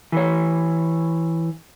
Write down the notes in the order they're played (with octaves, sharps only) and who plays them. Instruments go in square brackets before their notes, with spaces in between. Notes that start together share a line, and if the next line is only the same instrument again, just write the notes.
[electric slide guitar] E3 C#5